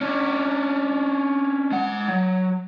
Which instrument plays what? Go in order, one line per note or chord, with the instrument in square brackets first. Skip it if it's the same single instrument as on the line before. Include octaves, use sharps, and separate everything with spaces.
[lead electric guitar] C#4 D4
G#3 F#5
F#3